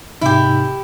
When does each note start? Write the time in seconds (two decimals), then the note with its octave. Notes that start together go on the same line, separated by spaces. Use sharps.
0.21 G#2 C3 D#4 E4 G4